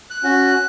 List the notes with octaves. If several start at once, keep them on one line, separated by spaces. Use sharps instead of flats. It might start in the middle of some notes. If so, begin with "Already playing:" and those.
F#6
C#4 F#4